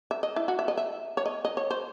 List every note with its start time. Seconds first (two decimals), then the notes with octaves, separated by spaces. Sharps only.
0.11 E5
0.23 D#5
0.36 E4
0.48 F#4
0.59 E5
0.68 D#5
0.77 E5
1.17 C#5
1.26 D#5
1.45 D#5
1.57 C#5
1.71 C5